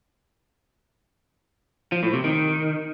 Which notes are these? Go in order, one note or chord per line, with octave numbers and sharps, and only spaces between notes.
F3
A2
C3
D#3